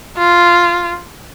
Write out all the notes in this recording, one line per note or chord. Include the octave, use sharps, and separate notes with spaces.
F4